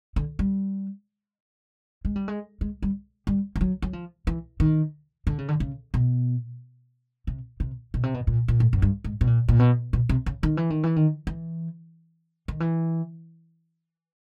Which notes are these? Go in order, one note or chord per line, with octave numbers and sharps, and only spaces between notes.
D3
G3
G#3
G3
G#3
G#3
G3
G3
F3
F#3
F#3
F3
E3
D#3
D3
C#3
D3
C#3
B2
C3
C3
B2
C3
B2
A#2
A#2
A2
F#2
G2
G#2
B2
A#2
A#2
B2
B2
C3
C#3
D#3
E3
D#3
E3
D#3
E3
D#3
E3